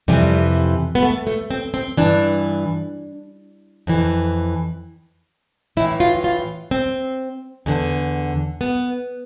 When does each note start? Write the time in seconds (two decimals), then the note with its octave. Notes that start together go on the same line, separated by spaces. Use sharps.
0.08 F2 C3 E3 G3
0.95 B3
1.03 A3
1.27 A3
1.51 C4
1.74 C4
1.97 G2 E3 D4
3.87 F2 E3
5.77 A2 E4
5.80 E3
6.00 F4
6.24 F4
6.71 C4
7.66 E2 D3
8.61 B3